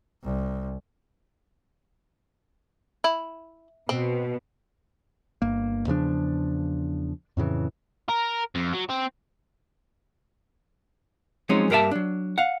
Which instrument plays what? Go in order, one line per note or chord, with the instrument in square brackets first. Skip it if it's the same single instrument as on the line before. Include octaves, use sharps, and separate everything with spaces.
[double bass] C2
[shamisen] E4
[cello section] B2 [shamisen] C4
[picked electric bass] G1 A#3
E2 C#3 F3 D4
F2 A2 C#3 E3
[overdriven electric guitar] A#4
F2
F#3
C4
[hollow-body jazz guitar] F3 F#3 G#3 C4 C#4 D#4
G2 A#3 A#4 D5 E5 A5
F#3 D4
F5 F#5